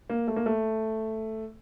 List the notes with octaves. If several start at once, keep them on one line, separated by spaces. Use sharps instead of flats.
A#3
A3
A#3
A3